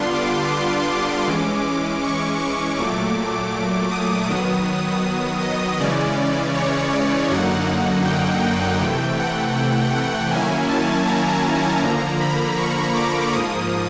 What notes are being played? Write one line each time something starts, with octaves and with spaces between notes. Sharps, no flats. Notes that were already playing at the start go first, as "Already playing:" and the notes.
Already playing: D3 G3 B3 D4 F4 C6
D6
D6
E3 G#3 C#4 D6
D6
C#6
C#6
A#2 F#3 A3 D6
D#6
D#3 F#3 B3
D#5
C#3 E3 G#3 C#4 D5
C#5
D5
F#2 D3 F#3 A#3 D#4 F#5
G5
G5
C3 E3 A3
F#5
F#5
D#3 F#3 A#3 C#4 E4 G#5
A5
A#5
D3 F3 A#3
B5
C#6
D6
G#2 F3 A#3 D#6